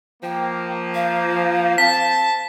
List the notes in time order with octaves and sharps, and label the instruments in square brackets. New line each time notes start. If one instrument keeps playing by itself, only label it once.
[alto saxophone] F3 [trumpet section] A#3 [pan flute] G5
[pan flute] F5
[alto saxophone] C4 [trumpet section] A5 [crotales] B6